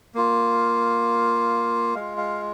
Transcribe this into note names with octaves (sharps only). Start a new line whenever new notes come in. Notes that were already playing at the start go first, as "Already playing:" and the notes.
A#3 F4
G#3 F4 F5
F5